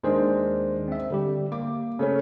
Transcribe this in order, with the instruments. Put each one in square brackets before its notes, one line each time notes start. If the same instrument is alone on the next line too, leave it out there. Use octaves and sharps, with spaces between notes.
[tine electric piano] D#2 D#3 C5 [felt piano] G#3 D4 A#4
[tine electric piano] C4 E5
D3 G3 G4
[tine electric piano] A#3 [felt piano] D6
[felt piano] C#3 A3 C#4